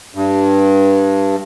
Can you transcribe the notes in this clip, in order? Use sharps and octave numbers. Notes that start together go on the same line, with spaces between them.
G2